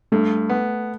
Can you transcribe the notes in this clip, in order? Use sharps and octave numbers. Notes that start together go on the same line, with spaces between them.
G2 A3
B3